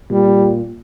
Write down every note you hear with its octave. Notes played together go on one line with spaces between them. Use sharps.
A#2 G3